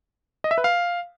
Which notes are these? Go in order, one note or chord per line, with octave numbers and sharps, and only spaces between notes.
D#5
E5
B4
F5